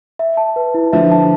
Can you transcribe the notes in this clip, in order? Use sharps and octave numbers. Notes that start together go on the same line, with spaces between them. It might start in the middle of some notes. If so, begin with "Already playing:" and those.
E5
A5
B4
E4
D3 F3 E5
A5